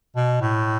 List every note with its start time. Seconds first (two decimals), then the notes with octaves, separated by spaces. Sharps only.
0.16 B2
0.41 A2